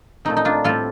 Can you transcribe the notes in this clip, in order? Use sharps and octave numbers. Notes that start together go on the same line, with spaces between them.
A#2 A3 C4 D#4
D#4
D4 F4
A2 G3 C4 F4 A4